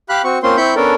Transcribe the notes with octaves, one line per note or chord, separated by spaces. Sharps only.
G4 F5 B5 F#6
C4 F#4 C#6
A#3 C4 C#4 F4 C5 C6
C4 E4 B5 C#6 G6
B3 C#4 D4 A4 A#4